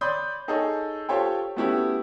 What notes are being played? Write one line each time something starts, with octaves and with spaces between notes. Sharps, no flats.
C#5 D5 B5 C6 D#6 G6
D#4 G#4 A4 C#5 D#5
F4 G4 A4 C5 C#5 G5
A3 B3 C#4 E4 F#4 G4